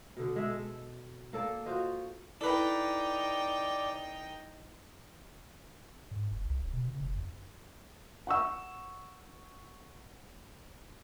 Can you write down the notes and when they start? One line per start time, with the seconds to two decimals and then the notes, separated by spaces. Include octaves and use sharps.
0.17 B2 D3
0.36 G#3 E5
0.50 A4
1.33 A#3 A4 D5
1.66 F4 F#4 C5 D#5
2.41 D#4 E4 A4 B4 D5 G5
6.11 G#2
6.31 F#1
6.45 C2
6.59 D1
6.73 B2
6.88 C#3
7.00 F#1
7.15 F#2
8.27 F#5 C#6 E6